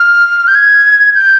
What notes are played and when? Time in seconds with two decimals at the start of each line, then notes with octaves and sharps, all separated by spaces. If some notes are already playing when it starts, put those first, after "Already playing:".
Already playing: F6
0.48 G6
0.55 G#6
1.15 G6